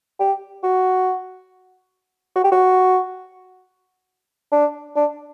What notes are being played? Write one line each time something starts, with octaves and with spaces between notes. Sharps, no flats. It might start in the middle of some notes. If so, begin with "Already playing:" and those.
G4
F#4
F#4
G4
F#4
D4
D4